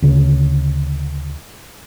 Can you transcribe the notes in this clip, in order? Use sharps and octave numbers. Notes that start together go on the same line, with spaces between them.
D2 C#3